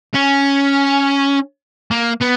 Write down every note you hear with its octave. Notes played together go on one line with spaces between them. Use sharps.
C#4
A#3
B3